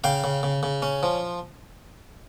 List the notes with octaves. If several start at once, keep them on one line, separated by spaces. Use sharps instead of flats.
C#3 F5 G5
C#3
C#3
C#3
C#4
F3